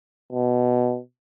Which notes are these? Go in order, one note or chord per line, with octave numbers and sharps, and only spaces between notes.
B2